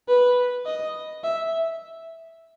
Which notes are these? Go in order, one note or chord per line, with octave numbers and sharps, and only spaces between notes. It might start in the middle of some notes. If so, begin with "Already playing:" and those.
B4
D#5
E5